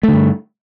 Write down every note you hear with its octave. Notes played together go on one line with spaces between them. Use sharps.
G2 D3 A3